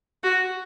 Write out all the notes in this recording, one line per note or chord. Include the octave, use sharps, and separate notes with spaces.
F#4